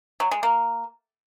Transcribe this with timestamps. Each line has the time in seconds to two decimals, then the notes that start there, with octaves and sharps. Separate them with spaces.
0.20 F#3
0.31 G#3
0.43 A#3